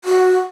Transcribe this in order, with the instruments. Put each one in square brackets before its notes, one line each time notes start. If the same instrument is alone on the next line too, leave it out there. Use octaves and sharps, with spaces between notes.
[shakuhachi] F#4